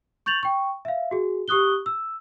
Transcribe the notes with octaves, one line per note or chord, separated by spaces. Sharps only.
C#6 G6 A6 F7 F#7
G5 C#6
E5 F5
F#4 G#4
G4 C#6 D#6 F#6 G7
E6